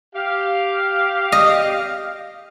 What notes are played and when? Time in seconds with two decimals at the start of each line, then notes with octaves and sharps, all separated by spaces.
0.15 G4 F5
1.32 D#5